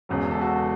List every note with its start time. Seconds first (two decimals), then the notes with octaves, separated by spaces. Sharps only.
0.09 E1 E2 C#3 F#3
0.31 A4
0.41 F#4